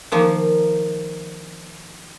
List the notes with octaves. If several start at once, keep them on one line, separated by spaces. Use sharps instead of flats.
D#3 F3 A#3